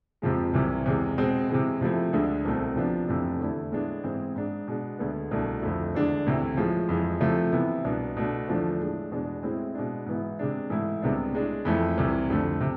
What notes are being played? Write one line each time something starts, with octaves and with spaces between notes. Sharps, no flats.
F2 C3 F3 G#3
C2 C3 E3
E2 C3 G#3
B2 G#3 C4
C3 E3 G#3
C3 F3 A3 E4
D2 D3 G#3 D4
C2 B2 A3 C4
C3 F3 B3 D4
F2 C3 E3 A3 D4
E2 D3 A3 E4
A2 G#3 B3 D4
G#2 E3 G#3 C4
G#2 G#3 D4
B2 G#3 D4
D2 D3 G#3 B3
C2 B2 A3 D4
F2 D3 A3 E4
E2 D3 G#3 D4
D2 C3 E3
A2 F3 G#3
F2 E3 G#3
C3 F3 A3 E4
C3 E3 B3 E4
C2 B2 B3 D4
B2 A3 D4
E2 D3 F3 A3 D4
A2 G#3 D4
E2 B2 G#3 D4
A2 G#3 C4 E4
B2 G#3 D4
G#2 E3 B3 E4
C3 G#3 D4
G#2 E3 A3 E4
C2 C3 G#3 B3 D4
A2 G#3 D4
F2 E3 A3 E4
C2 C3 E3
F2 D3 A3
C3